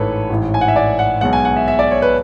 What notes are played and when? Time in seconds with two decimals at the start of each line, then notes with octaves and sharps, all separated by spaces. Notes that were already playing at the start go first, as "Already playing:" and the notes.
Already playing: A1 G#2 E3 A4 B4 C#5
0.30 A1 G#2 E3
0.54 G#5
0.61 F#5
0.68 E5
0.76 D5
0.99 F#5
1.21 B1 B2 G#3 F#5
1.33 G#5
1.45 F#5
1.56 E5
1.68 E5
1.79 D5
1.91 C#5
2.02 B4